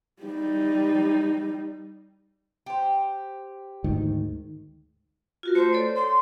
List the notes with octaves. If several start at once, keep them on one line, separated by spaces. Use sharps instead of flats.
G3 D#4
G4 C5
D2 G#2 D#3
F4 F#4 A#4
A3 C5
A4 C#5 D5
C6